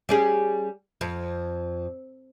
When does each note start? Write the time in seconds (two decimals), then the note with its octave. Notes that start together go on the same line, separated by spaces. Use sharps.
0.09 G3 C#4 G#4
1.01 F2